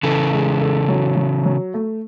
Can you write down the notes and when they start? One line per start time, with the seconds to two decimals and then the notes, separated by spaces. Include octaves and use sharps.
0.03 C#3 E3 A4
0.33 G#3
0.60 A4
0.89 F#3
1.16 F#3
1.45 F#3
1.74 A3